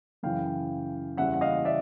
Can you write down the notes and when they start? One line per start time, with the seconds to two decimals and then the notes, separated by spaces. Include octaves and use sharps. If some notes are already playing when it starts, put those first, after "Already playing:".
0.23 F#2 C#3 E3 F5 G5
1.17 E2 C#3 E3 G3 E5 F#5
1.34 F#5
1.41 D#5 F5
1.65 D5 E5